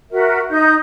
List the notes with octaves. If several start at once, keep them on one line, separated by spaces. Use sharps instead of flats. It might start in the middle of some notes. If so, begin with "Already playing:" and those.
F#4 A#4 E5
D#4 D#5 G6